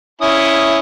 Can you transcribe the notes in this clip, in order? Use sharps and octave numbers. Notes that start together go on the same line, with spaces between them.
C#4 E4 D#6